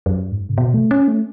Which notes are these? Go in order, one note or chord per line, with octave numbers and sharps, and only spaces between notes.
F#2
G#2
C#3
B2
A3
C#4
A3